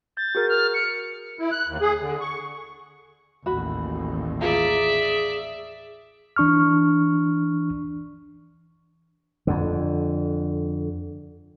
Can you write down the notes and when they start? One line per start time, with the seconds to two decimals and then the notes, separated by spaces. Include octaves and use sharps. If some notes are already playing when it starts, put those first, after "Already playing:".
0.17 G6 A6
0.35 F#4 G#4 A#4
0.49 F6
0.74 C#7
1.39 E4
1.51 F#6
1.68 D#2
1.81 G#4
2.00 D3
2.21 C#6
3.46 A1 D#2 F#4 B5
4.41 F4 G#4 D5 E5 A#5
6.36 E3 D4 C#6 F6
9.47 F2 D3